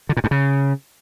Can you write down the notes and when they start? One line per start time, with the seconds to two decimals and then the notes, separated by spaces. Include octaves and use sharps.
0.09 D3
0.17 A#2
0.24 G2
0.31 C#3